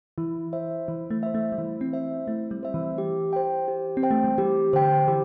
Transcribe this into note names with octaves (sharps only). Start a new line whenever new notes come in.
E3 E4
C5 E5
E3 E4
A3
C5 E5
A3
G3
E3 E4
C4
C5 E5
A3 E4
G3
C5 E5
E3
G4
C5 G5
G4
C4
C5 G5
A3
G3
E3 G4
D3 C5 G5
E3 G4